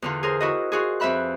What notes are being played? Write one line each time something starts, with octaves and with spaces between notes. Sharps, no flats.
E2 D3 F4
G#4 A#4 C5
E4 F#4 D#5
F4 F#4 G#4
F2 B4 E5 B5 F#6